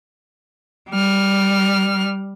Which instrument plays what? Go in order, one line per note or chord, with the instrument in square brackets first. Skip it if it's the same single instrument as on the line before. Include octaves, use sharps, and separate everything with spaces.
[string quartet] G3 F6